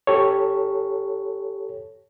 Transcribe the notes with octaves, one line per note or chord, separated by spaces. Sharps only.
G4 A4 C#5